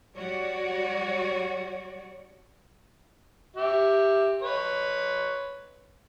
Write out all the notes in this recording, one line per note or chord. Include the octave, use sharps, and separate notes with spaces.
G3 F#4 C#5 D5
G4 E5
B4 C#5